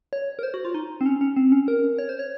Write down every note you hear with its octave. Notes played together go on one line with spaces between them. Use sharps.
C#5
A#4
C5
F#4
F4
D#4
C4
C#4
C#4
C4
C#4
A#4
C#5
C5
C#5